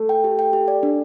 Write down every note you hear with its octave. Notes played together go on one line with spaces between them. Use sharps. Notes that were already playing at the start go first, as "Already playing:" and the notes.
Already playing: A3
G5
G4
G5
G4
D5
D4